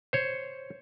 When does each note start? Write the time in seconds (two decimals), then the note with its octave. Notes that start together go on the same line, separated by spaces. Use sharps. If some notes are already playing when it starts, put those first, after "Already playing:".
0.13 C5 C#5